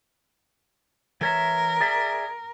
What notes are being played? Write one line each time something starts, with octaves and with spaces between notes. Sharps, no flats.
E3 A#4 C#5 E5
G#4 D5 E5